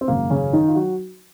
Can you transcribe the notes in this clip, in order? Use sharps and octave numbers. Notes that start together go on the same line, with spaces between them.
C4
G#1 F#2 C#3 A#3
C#3 C#4
D#3 D#4
F4
F#3 F#4